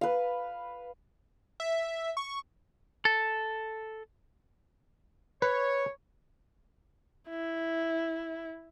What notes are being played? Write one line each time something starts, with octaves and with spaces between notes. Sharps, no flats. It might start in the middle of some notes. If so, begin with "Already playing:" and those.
B4 F5
E5
C#6
A4
B4 C#5
E4